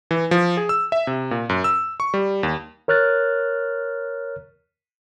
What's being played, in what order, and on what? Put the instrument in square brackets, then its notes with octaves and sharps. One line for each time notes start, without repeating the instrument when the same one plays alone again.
[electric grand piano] E3
F3
G#4
E6
E5
C3
A#2
F#2
E6
C#6
G3
D#2
[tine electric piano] A#4 C#5 F6 F#6 A6